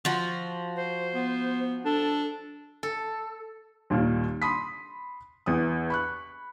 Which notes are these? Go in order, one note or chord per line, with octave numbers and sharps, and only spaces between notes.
F3 F#4
C5
B3
D4 A4
A4
D#2 A#2 D#3 G3
B5 C6 D#6 B6
E2 D#6
B5 C#6 F#6